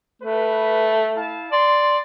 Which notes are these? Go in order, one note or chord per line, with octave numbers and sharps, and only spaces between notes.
A3 B4
E4 F5 A5
D5 C6